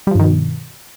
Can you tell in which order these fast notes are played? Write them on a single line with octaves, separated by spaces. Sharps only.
G3 F3 G2 D#3 B2